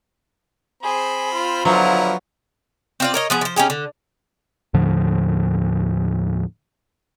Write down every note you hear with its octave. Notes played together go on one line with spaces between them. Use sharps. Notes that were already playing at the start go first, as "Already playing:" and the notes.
C4 G#4 C5 B5
F4
D3 F3 F#3 B3 E4 A#5
C4 F4 D5
A#4 C#5 D#5
F3 B3 G#4
F3 C5
C#4 D#4 G4 G#4
D3
D#2 A2 D3 F3